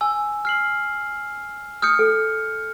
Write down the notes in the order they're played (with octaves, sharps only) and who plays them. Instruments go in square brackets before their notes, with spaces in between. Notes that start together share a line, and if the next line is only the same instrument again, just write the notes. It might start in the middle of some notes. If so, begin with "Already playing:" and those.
[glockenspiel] G#5 E6
F6 C7 F#7
[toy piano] D#6 [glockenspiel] F6 G6 C#7
[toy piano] A4